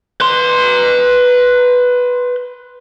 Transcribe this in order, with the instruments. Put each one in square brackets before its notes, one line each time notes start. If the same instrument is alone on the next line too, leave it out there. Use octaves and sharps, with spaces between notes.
[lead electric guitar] B4 C6